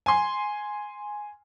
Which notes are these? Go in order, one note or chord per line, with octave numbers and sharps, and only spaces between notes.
G#5 C6